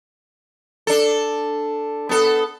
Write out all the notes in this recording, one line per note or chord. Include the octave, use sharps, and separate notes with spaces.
D4 A4
B3 A4